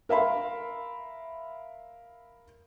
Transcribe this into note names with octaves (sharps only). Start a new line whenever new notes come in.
A#4 E5 F5 B5 C6